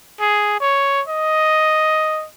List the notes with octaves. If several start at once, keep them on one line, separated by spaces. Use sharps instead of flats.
G#4
C#5
D#5